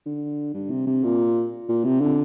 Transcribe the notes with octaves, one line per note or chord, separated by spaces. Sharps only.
D3
G2
C3
C3
A#2
A#2
C3
D3